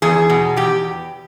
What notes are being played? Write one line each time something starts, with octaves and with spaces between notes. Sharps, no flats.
E2 G#4
B2
E2 G4